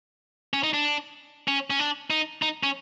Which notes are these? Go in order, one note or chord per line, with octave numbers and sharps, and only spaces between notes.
C#4
D#4
D4
C#4
C#4
D4
D#4
D#4
C#4